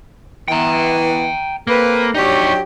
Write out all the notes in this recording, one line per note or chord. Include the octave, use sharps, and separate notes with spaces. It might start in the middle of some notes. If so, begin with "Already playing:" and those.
E3 B3 G5 A#5
A#3 C4 A4 B4
F#3 D4 D#4 G4 C#5